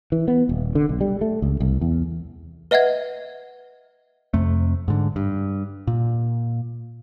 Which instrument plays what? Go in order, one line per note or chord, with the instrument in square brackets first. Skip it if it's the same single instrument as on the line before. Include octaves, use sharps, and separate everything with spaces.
[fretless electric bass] E3
B3
D#1
D3
B1
G3
A3
C#2
C2
E2
[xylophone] B4 D#5 E5 F#5 G#6
[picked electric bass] F2 C3 A3
G#2 D3
G2
A#2